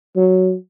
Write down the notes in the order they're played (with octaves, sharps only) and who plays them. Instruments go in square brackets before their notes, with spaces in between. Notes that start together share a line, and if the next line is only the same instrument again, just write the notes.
[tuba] F#3